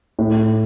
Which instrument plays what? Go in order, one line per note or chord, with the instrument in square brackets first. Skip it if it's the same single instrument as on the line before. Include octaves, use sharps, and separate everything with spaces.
[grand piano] A2